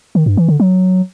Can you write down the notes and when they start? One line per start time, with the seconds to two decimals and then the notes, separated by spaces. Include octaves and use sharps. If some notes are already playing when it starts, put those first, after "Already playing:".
0.15 D#3
0.26 G2
0.37 E3
0.48 D3
0.60 F#3